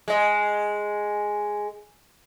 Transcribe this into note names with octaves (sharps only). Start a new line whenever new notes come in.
G#3 D#5